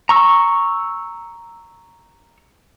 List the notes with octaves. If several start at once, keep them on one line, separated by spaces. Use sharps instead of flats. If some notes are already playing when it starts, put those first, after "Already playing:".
A#5 C#6 E6